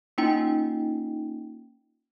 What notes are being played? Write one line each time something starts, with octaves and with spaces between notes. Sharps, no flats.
A#3 C#4 D#4 F4 G5